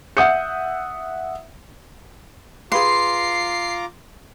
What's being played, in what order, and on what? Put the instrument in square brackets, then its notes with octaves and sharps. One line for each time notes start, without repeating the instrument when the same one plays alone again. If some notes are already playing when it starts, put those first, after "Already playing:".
[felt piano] E5 F#5 D#6 G6 C#7
[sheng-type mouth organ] F4 A#5 D6 [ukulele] G#4 B4 F5 [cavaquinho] C6 [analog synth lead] C7